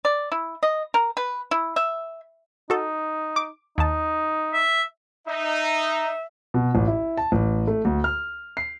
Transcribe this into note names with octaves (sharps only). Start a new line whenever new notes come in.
D5
E4
D#5
A#4
B4
E4
E5
D#4 F#4 A4
D6
D#2 D#4 A5
E5
D#4 E5
B2
A1
E4
A5
A1
A3
D2
F6
C7